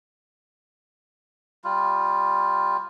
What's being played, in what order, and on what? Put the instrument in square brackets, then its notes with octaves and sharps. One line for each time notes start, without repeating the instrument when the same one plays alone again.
[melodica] G3 F4